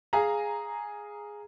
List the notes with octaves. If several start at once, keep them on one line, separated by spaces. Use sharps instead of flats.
G#4 F5 G#5 A#5